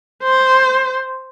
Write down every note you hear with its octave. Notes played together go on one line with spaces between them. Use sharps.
C5